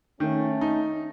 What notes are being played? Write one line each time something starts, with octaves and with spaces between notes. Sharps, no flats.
D#3 A3 C#4
D#4